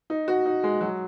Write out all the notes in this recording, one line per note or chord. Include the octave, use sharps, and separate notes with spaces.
D#4
F#4
D#4
G#3
F#3